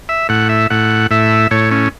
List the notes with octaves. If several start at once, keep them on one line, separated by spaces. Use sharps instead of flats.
E5
A2 F#5
E5
A2 F#5
A2 E5
A2 C#5
C#4